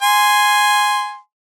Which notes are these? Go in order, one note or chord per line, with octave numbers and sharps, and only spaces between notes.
G#5 C6